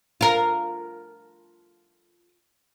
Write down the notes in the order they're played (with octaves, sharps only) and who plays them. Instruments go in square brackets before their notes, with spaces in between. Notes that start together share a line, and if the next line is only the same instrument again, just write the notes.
[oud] F4 A#4